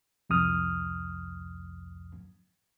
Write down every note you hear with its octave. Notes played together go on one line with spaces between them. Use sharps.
C2 F2 D#6 F6